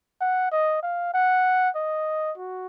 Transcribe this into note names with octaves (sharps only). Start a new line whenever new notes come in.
F#5
D#5
F5
F#5
D#5
F#4